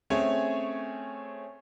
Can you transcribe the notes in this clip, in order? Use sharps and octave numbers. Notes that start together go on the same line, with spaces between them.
A3 C4 C#4 G#4 C#5 G#5